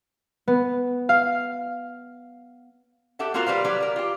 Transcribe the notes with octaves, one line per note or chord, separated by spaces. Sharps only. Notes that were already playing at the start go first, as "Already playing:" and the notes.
B3
F5
G4 A4 E5 F#5
A#3 C4 F4 F#4 A#4
G3 B4 C5 F5
F#3 G3 B4 D5
G3 A#4
F4 G4